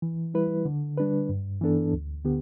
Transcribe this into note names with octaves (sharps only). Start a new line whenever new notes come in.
E3
G3 E4 B4
D3
G3 D4 B4
G2
E3 B3 D4 A4
D2
D3 B3 G4